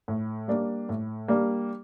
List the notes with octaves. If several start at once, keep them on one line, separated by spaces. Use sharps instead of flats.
A2
G3 A#3 D4
A2
G3 A#3 D4